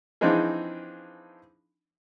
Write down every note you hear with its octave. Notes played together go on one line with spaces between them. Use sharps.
E3 F3 C4 D4 D#4 G#4